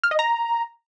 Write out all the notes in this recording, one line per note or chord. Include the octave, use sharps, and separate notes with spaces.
F6
D#5
A#5